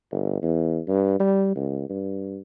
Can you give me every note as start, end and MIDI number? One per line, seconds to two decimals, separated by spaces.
0.12 0.42 31
0.42 0.79 40
0.88 1.15 43
1.20 1.51 55
1.56 1.85 37
1.90 2.39 43